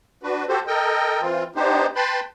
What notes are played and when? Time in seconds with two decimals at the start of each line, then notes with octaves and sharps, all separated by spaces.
0.23 D4 F#4 B4
0.48 F#4 G4 A4 C5
0.67 A4 A#4 D#5 G5
1.21 E3 C4 F4
1.56 B3 D4 D#4 G4 C5
1.96 B4 G5 A5 B5 C6